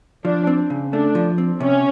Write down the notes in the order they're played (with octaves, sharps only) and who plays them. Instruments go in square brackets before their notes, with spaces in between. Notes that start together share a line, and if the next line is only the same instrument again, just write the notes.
[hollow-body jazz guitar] F3 [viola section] D4
[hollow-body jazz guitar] C4
C#3
[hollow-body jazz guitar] A3 [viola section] D4
[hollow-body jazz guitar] F3
C4
[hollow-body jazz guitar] C3 [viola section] C#4